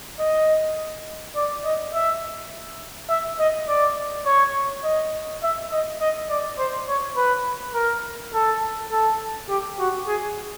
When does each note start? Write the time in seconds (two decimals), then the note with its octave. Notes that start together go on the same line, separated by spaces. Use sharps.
0.19 D#5
1.35 D5
1.65 D#5
1.94 E5
3.10 E5
3.39 D#5
3.68 D5
4.26 C#5
4.84 D#5
5.43 E5
5.72 D#5
6.00 D#5
6.30 D5
6.58 C5
6.89 C#5
7.17 B4
7.75 A#4
8.34 A4
8.92 A4
9.49 G4
9.79 F#4
10.07 G#4